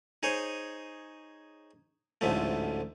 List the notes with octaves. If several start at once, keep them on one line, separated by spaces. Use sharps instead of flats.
D#4 G#4 C5 C#5
A1 D2 G#2 F3 A3